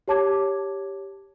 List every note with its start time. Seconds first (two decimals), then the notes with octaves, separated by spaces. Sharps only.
0.08 G4 C#5 A5 D6 G#6